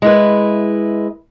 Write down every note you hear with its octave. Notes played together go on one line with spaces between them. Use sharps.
G#3 E4 B4